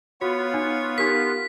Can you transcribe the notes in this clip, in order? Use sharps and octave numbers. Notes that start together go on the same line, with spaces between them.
B3 F4 F#4 C#5
D#4
D#4 G4 A#4 B6